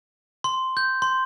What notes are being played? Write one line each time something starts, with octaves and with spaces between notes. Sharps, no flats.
C6
G6
C6